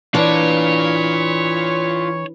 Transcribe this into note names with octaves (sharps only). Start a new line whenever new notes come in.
E3 D4 F4 C#5 D5